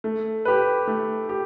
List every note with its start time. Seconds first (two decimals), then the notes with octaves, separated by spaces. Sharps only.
0.04 A3
0.45 G4 B4
0.87 A3
1.29 G4